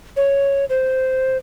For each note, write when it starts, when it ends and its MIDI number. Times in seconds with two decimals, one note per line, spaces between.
0.17 0.65 73
0.70 1.37 72